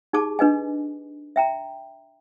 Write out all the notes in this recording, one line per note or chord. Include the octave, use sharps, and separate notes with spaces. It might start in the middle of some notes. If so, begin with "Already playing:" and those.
D#4 G4 G#4 A5 D6
D4 B4 D#5 G#5
E5 G5 A#5